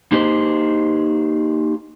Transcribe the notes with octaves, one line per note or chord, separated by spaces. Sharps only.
A#3 D#4 G4 G#4 C5 D#5